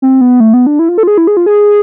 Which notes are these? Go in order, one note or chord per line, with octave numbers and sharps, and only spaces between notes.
C4
B3
A3
B3
D4
E4
F4
A4
F4
G#4
E4
G#4
F4
G#4